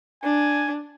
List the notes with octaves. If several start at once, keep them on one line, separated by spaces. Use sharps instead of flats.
D4 G#5